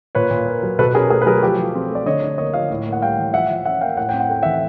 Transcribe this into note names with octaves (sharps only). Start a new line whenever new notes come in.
A#2 B4 C#5
A#2
A#3
F#3
B2 A4 B4
C#4 G#4 A#4
A3 G#4 A#4
B4
F#3 G#4 A#4
F3 G4 A4
F3
C4
A3 D5
D3 C#5 D#5
D4
A#3 C#5 D#5
F3 D#5 F5
A2
A#3
F#5
G3 F5 G5
E3
F3 E5 F#5
F3
C#4 E5 F#5
A#3 F5 G5
A2 F#5
C4 G5
F#5
A3 G5
E3 E5 F#5